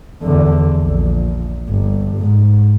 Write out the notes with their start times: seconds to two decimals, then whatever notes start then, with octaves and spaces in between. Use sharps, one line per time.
0.23 E2 D3
0.81 A#1
1.68 G1
2.18 G#2